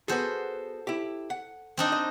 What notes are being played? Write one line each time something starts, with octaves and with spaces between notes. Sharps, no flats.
B3 F#4 G#4 A4 C5
E4 G4
F#5
C4 D4 D#4
D#5